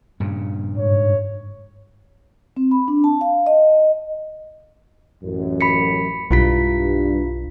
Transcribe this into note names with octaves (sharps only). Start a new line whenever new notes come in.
G2 A#2 C#3
G#2 C#5
C4
B5
D4
A5
F5
D#5
A1 F#2
B5 B6 C#7
B1 G2 E4 F4 B6